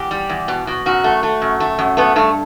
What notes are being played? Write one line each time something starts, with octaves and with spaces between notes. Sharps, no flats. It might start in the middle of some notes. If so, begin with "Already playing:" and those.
Already playing: E2 G4
G3
E2
B2
B2
F#2 F#4
A3
A3
F#2
A3
F#2
A3 B3
G2 A3